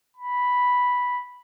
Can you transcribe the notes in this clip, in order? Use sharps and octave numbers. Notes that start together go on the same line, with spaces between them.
B5